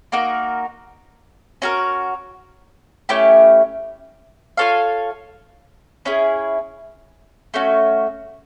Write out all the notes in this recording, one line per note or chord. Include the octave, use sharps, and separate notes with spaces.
A#3 D#4 F#4 A#4
C#4 F#4 A#4
A3 C#4 E4 G4
F4 A4 C#5 F5
C#4 E4 G#4
A3 C#4 F#4